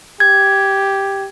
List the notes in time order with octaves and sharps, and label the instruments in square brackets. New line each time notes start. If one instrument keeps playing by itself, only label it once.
[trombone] G4 [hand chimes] G#6